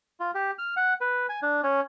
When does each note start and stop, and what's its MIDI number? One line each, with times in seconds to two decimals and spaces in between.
0.20 0.31 65
0.35 0.51 67
0.58 0.75 89
0.77 0.94 78
1.01 1.26 71
1.29 1.40 80
1.43 1.61 62
1.63 1.80 61